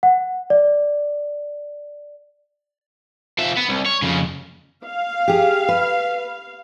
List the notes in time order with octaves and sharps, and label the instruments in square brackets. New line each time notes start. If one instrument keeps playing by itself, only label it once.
[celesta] F#5
D5
[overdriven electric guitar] F3 E5
B3
C2
C#5
F2 C#3
[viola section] F5
[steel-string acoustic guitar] G4 G#4
B4